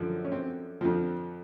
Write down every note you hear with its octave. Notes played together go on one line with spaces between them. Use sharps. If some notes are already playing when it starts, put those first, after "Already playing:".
Already playing: F#2 D3 F3
C#4
C4
F2 D3 F3 C4